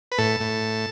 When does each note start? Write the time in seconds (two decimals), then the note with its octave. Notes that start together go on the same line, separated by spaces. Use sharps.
0.12 B4
0.18 A2 A4
0.40 A2